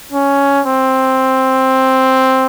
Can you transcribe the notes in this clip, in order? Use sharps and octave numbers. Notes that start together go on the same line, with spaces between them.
C#4
C4